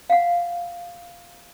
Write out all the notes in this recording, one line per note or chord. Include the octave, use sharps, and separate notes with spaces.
F5 F#5